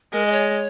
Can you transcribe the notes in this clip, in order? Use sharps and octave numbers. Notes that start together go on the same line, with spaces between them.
G#3 A#4
D#5
C#5